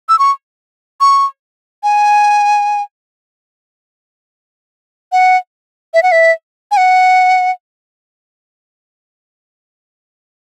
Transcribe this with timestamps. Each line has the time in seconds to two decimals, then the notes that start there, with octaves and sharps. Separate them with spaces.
0.09 E6
0.19 C#6
1.01 C#6
1.83 G#5
5.12 F#5
5.94 E5
6.03 F#5
6.12 E5
6.71 G#5
6.77 F#5